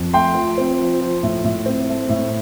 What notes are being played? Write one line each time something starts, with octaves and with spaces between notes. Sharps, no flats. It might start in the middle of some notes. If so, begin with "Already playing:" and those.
Already playing: F2
A3 G5 C6
F3
C4
F3
F3
A2
A2
C4
A3
A2